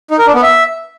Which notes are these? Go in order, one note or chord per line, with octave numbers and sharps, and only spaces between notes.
D#4
A#4
D4
B3
E5